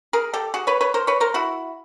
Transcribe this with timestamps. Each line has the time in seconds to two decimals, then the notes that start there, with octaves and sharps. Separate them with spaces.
0.13 G#4 A#4
0.33 G4 A4
0.54 F#4 G#4
0.67 B4 C#5
0.81 B4 C#5
0.94 A#4 C5
1.07 B4 C#5
1.20 A#4 C5
1.34 E4 F#4